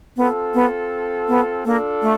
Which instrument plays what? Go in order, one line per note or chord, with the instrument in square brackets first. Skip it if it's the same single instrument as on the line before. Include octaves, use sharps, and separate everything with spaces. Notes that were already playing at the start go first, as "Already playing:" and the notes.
[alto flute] B3 [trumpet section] C4 F4 A4
[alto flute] B3
B3
[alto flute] A#3 [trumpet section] D4 F4 A4
[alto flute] A3